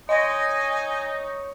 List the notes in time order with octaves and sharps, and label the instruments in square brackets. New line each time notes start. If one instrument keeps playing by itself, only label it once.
[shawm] D#4 [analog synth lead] C#5 [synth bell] D#5 A#6 [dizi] G#5